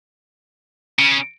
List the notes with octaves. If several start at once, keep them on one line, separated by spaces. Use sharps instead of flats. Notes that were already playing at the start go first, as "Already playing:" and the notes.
C#3